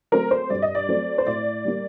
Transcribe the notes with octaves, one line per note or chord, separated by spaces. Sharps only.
F#3 A3 C4 A#4
C5
G2 D5
D#5
D5
F#3 A3 C4
C5
A2 D5
G3 A#3